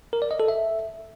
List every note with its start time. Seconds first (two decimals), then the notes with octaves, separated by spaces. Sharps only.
0.13 A#4
0.22 D5
0.31 D#5
0.40 A4
0.48 E5